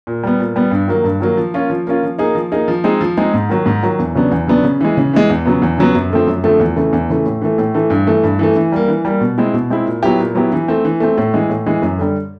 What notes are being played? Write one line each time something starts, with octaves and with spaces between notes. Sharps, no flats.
A#2
G3 B3
A#2
G3 B3
G2
D#3 F#3 A#3
G2
D#3 F#3 A#3
F3
A#3 C#4 F4
F3
A#3 C#4 F4
F3
A#3 D#4 G#4
F3
A#3 D#4 G#4
F3
G#3 C4 D#4 G#4
F3
G#3 C4 D#4 G#4
G#2
D#3 F#3
G#2
D#3 F#3
E2
C#3 F#3 B3 D4
E2
C#3 F#3 B3 D4
C#3
E3 G#3
C#3
E3 G#3
E2
C#3 F#3 B3
E2
C#3 F#3 B3
F#2
D3 F3 A3 C4
F#2
D3 F3 A3 C4
E2
C#3 E3 A3
E2
C#3 E3 A3
A2
E3 A3
A2
E3 A3
G2
E3 A3
G2
E3 A3
E3
G3 A#3
E3
G3 A#3
B2
G#3 C4 E4
B2
G#3 C4 E4
A#2
F#3 B3 E4 G4
A#2
F#3 B3 E4 G4
E3
A3 C4
E3
A3 C4
A2
E3 G#3
A2
E3 G#3
F#2
D3 G3